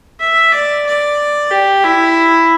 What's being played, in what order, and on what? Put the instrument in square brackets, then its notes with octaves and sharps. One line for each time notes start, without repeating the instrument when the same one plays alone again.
[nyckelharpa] E5
D5
D5
G4
E4